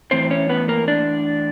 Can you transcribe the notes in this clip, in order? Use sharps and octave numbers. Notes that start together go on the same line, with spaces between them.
A2 E3 C4 C5
C#4 C#5
B3 B4
A#3 A#4
D4 D5